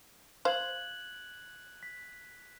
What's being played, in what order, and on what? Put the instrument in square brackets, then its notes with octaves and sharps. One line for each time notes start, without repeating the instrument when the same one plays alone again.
[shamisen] C5 F5 [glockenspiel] F#6 G#6 F#7
[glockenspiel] B6